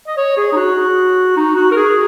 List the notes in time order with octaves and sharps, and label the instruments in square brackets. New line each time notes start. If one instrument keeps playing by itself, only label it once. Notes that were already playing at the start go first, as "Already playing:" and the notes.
[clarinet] D#5
C#5
G#4
D#4
F#4
D#4
F#4
A#4
G#4